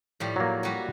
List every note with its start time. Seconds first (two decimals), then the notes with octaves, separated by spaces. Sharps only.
0.20 A2 F3 G3
0.36 F#3 A#3
0.63 G3 F#4